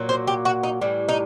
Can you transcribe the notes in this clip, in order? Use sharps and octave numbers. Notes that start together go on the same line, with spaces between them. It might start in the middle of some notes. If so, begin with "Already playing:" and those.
Already playing: A#2 F#3 A#3
C5
G4
F#4
D#4
A2 E3 G3
D#4